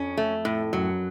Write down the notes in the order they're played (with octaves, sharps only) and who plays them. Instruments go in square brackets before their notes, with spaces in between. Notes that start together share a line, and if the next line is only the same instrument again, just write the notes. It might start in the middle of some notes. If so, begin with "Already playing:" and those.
Already playing: [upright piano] F2 [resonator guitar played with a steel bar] C#4
[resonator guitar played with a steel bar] A3
A2
[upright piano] F#2 [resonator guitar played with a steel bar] F#3